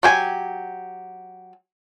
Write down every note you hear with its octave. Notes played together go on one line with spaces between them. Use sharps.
F#3 G4 G#5